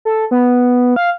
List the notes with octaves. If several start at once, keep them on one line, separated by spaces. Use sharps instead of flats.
A4
B3
F5